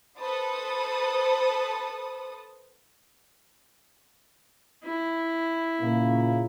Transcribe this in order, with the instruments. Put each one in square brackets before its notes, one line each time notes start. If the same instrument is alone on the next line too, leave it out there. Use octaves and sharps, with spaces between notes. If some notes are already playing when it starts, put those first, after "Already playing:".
[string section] A4 B4 C5 A5 D#6
[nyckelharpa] E4
[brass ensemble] A#2 C#3 A#3